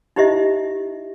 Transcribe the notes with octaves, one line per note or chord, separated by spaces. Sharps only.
D#4 E4 G4 C5 D#5 E5